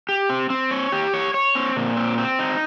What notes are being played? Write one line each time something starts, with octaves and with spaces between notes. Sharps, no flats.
G4
C4
C4
C#5
G4
C#5
C#5
C4
A#2
C4
C4
D#4